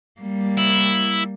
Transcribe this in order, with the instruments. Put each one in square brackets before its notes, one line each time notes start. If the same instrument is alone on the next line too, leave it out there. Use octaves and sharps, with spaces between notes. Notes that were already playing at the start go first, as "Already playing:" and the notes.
[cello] G3 A#3
[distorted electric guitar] E4